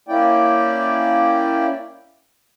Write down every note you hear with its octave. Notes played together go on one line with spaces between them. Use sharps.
A#3 C#4 E4 D5 G5